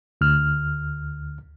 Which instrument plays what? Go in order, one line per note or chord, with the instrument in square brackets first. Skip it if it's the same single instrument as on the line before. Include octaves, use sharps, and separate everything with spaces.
[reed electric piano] D2 F6